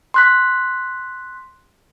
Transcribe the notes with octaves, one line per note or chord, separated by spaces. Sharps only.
C6 F#6 B6